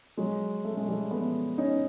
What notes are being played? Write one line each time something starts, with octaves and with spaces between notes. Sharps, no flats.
F#3 G#3
A3
G#3
G3 A3
A3 B3
C#4 D#4